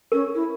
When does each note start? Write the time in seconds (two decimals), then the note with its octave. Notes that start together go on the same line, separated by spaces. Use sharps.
0.12 C#4 A#4
0.34 E4